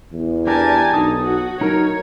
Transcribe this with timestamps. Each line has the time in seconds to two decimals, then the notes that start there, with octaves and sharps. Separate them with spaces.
0.13 E2
0.47 D4 G4 A#4 G#5 A5
0.94 B1 D#4 D#6
1.23 F#4
1.61 F#3 D#4 A#4 C#5